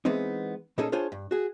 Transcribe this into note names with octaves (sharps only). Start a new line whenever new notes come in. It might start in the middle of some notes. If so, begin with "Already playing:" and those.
E3 G#3 B3 C4 D#4
A#2 A#3 C#4 D#4 G#4 A4
D4 F4 G#4 C5 C#5 G#5
G2
F#4 G#4